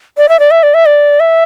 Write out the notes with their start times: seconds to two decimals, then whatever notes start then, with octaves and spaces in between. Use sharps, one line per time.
0.18 D5
0.29 E5
0.40 D5
0.51 E5
0.63 D5
0.74 E5
0.86 D5
1.20 E5